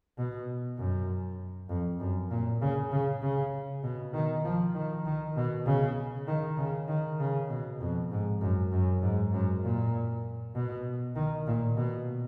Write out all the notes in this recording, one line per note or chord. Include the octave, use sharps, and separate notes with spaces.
B2
F#2
F2
F#2
A#2
C#3
C#3
C#3
B2
D#3
F3
D#3
D#3
B2
C#3
D#3
C#3
D#3
C#3
B2
F2
G#2
F#2
F#2
G#2
F#2
A#2
B2
D#3
A#2
B2